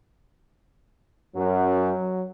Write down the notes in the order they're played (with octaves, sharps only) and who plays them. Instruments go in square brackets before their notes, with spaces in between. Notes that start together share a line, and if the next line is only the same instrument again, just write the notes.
[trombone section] F#2 [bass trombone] F#3